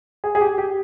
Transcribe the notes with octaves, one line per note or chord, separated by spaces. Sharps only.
G#4
G#4
G4
G4